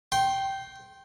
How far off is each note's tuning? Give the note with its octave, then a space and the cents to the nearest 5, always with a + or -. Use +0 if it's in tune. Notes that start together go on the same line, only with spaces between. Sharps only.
G5 -10 C6 +15